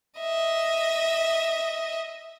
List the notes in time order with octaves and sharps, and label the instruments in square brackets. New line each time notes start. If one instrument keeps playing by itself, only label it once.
[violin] D#5 E5